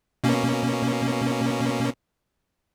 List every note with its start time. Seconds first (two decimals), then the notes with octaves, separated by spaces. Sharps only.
0.24 B2 A#3 C#4